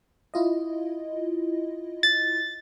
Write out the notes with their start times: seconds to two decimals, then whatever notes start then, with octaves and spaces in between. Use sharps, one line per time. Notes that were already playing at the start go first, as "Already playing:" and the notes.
0.34 E4 F4 D#5
2.03 A6